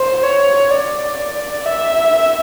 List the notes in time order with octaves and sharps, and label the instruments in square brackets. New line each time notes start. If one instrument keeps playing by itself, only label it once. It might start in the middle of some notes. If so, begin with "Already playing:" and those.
Already playing: [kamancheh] C5
C#5
D5
E5